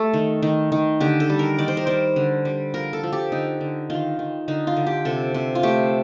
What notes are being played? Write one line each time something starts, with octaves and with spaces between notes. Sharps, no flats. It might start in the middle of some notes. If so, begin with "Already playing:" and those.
Already playing: A3 G4 A4
D#3
D#3
D#3
D3 G4
A4
G3
A#4
D#3 D5
C5
A#4
G3 C5
D3
G3
F3 A#4
A4
F3
G4
D3 D#4
D3
D#3 F4
D#3
D3 D#4
F4
D3
G4
C3 A4
C3
F4
A3 G4